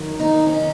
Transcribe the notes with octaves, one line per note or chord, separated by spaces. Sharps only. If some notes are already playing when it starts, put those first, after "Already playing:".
Already playing: F#2 D#3
D#4
C#4